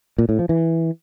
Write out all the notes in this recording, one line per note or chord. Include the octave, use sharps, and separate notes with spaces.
A#2
A2
F3
E3